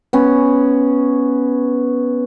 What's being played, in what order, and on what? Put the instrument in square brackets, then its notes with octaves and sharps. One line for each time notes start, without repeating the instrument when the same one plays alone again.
[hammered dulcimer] B3 C#4